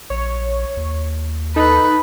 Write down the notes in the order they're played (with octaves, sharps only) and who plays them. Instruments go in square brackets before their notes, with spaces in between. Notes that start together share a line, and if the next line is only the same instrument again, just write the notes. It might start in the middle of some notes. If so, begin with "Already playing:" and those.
[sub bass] A#1 [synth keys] C#5
[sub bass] D#2
[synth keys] D#4 A4 [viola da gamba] B4